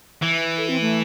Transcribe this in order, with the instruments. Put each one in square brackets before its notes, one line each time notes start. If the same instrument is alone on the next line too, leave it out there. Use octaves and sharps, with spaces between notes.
[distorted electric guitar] E3
[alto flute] A4
C4
A3